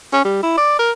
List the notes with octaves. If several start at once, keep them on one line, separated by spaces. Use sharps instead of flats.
C#4
G3
E4
D5
A#4